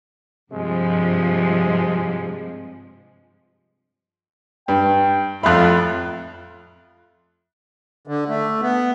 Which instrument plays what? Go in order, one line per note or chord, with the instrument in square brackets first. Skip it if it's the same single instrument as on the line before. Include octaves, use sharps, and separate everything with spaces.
[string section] G2 F3 [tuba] C3 [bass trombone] G#3
[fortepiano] G2 [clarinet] G5
[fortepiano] F2 B5 [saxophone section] A2 F4 [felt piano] E5 F#6
[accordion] D3
A3
B3